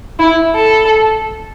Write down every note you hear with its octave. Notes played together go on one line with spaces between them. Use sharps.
E4
A4